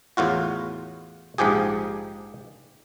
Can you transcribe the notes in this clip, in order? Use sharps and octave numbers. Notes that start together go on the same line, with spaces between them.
E2 A2 F4 F#4
A#1 G#2 F3 G4 G#4